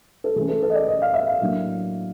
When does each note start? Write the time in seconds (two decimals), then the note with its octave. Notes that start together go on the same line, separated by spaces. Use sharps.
0.24 A4
0.36 E3 A3 C#4 G#4
0.48 A4
0.63 A4
0.70 D#5
0.75 D5
0.88 D#5
1.02 F5
1.14 E5
1.28 F5
1.41 A2 F#3 A#3 D4